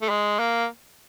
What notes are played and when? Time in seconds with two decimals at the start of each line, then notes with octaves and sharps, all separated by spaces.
0.02 A3
0.09 G#3
0.39 A#3